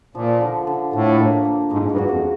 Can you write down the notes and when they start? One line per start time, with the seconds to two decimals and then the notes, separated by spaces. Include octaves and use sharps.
0.15 A#2 F3
0.41 D3
0.67 D3
0.93 A2 D4
1.19 A#3
1.45 A#3
1.71 G#2 G#3
1.92 G2
1.98 F#4
2.11 F2